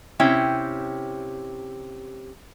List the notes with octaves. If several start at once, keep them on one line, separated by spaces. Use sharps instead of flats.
C3 C#4 E4 G5